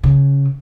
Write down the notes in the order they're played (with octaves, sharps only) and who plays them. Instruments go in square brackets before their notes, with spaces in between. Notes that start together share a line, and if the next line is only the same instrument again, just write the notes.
[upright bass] C#3